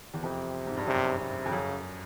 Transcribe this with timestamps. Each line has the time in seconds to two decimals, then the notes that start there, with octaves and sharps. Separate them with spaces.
0.14 E2
0.23 F2 C3
0.67 G#2
0.77 G2
0.87 F#2 C3
1.19 C3
1.45 F2
1.51 F#2 C#3